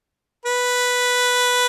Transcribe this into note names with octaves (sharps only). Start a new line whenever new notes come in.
B4